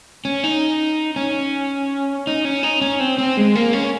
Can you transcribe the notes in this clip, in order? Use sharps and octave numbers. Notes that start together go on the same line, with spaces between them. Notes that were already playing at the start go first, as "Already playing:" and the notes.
C#4
D#4
C#4
D#4
C#4
D#4
C#4
C4
C4
G#3
A#3
C#4